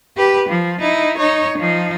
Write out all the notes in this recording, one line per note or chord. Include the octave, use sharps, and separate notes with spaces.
G4 B4
F3
D#4 E4
D#4 C#5
F3 D#4